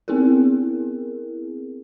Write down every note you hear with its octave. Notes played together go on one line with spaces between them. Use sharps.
B3 C4 E4 G#4 A#4